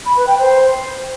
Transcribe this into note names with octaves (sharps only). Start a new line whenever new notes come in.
B5
B4
G5
C5